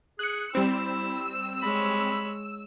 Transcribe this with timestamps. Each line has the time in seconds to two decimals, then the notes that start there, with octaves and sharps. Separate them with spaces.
0.19 G#4 F#6 C#7
0.55 G3 C4 E4 E6
1.62 G#3 C#5 B5